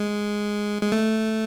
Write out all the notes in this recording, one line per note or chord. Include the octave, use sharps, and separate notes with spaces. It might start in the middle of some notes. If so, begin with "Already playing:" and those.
Already playing: G#3
G#3
A3